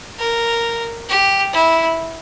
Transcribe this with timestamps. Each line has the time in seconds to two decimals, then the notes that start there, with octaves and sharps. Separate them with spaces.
0.19 A#4
1.09 G4
1.53 E4